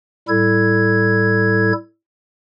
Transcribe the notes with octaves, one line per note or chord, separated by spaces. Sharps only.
A2 G3 E4 A4 G#6